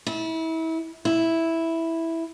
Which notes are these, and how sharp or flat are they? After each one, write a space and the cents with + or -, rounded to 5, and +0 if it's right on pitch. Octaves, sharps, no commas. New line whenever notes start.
E4 -30
E4 -5